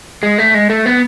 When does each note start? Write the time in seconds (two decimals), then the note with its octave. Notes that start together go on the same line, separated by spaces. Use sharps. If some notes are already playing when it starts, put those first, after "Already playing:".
0.23 G#3
0.38 A3
0.54 G#3
0.70 A3
0.86 B3